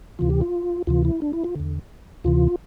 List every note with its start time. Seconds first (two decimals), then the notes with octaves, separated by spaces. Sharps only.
0.19 D2 C3 E3 F4
0.30 G4
0.41 F4
0.87 D2 C3 E3 F4
1.05 E4
1.22 D4
1.33 E4
1.44 F4
1.55 E2 D3
2.24 D2 C3 E3 F4